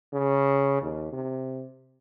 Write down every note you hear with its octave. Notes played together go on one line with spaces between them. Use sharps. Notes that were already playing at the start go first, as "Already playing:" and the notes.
C#3
D#2
C3